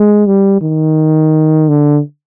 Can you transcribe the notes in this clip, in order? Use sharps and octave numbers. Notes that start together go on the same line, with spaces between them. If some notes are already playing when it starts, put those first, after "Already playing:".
Already playing: G#3
G3
D#3
D3